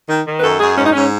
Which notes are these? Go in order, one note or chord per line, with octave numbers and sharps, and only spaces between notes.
D#3
D#3
B4
F#2 A4
F#2 G#4
G#2 C#4
D#4
G#2 C#4